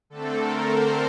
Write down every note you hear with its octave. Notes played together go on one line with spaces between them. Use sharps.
D3 A3 C4 A4
A#4
C5